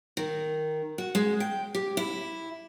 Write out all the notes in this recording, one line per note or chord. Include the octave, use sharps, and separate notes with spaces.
D#3
F#4
G#3
G5
G4
E4